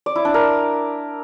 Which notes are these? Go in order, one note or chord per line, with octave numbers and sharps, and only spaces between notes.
D5
E4
D4
A#4